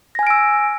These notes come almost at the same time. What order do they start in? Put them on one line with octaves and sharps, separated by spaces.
A#6 G#5 F6 D7 E6